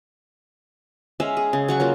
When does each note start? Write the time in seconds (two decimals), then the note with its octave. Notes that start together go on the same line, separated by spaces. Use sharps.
1.20 G#3 C#4 E5 F5
1.37 G#4
1.53 C#3
1.68 F#3 F#5 C#6
1.80 F#3 A#3 F4